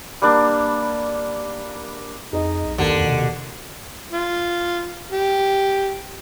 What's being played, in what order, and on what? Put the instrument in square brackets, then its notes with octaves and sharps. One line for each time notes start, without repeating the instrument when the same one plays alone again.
[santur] G3 A#3 D4
[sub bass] F2 [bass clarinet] D#4 [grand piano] G#4 D#5
[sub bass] B1
[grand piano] D#2 [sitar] D3
[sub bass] F2 [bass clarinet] B2
[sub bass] C3
[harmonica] F4
G4